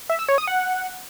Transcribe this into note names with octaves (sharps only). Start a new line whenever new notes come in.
E5
E6
C#5
D#6
F#5